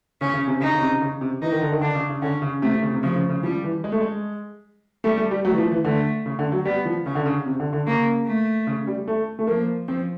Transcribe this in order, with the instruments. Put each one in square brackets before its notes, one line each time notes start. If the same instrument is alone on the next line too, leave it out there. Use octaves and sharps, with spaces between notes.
[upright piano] C#3 [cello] C#4
[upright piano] C#3
C3
[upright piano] C#3 [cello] D#4
[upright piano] C#3
C3
C#3
C3
[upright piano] E3 [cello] D#4
[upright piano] D#3
D3
D#3
[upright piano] D3 [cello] D4
[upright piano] C#3
C#3
[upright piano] D3 [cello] C#4
[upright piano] C#3
[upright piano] C3 [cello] A3
[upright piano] C3
C#3
C3
[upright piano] C#3 [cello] F3
[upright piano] C#3
C#3
[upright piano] F3 [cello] G3
[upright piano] E3
G#3
A3
G#3
[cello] G3 [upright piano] A3
[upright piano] A3
G3
[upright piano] F#3 [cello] A3
[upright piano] E3
F3
E3
[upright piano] D3 [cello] A3
[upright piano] C#3
D3
F#3
[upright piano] G3 [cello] B3
[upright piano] F3
[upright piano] C#3 [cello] C#4
[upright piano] D3
C#3
C3
D3
D3
[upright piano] C#3 [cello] A#3
[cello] A3
[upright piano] C#3
G3
A3
A3
[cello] F3 [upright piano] A#3
[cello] F3 [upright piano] C4